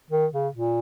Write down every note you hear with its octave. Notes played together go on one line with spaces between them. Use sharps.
D#3
C#3
A#2